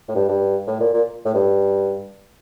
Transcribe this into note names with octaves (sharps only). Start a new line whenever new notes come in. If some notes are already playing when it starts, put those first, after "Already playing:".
A2
G2
G2
A2
A#2
A#2
A2
G2